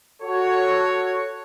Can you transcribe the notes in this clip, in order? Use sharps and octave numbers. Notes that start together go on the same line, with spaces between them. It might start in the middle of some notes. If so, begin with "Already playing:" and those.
F#4 A4 C#5